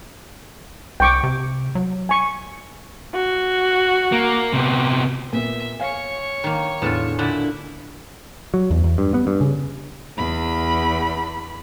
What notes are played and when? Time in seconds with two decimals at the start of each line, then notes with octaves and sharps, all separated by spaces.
1.00 C2 G5 C#6 D6
1.23 C3
1.75 F#3
2.09 G#5 C#6
3.14 F#4
4.12 A#3
4.53 C3 B3
5.33 A#2 B3 E5
5.80 C#5 F5 G#5 C#6
6.44 D#3 A#3
6.82 E2 A2 D3 F4 E7
7.19 A#2 D3 E4
8.54 F#3
8.70 E2
8.84 E2
8.98 G2
9.14 B3
9.27 G2
9.41 C#3
10.18 E2 B5